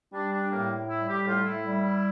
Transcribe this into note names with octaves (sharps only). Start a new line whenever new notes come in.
G3 D4
D4
A2 A#3
G3 E4
G4
A2 F4
E4
G3